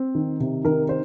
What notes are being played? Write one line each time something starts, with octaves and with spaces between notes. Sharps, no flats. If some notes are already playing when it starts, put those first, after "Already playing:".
Already playing: C4
D#3
C3
D#3 A#4
C5